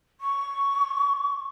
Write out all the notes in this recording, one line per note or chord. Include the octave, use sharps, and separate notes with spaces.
C#6